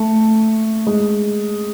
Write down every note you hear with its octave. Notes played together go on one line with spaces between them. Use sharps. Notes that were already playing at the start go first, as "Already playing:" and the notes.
Already playing: A3
G#3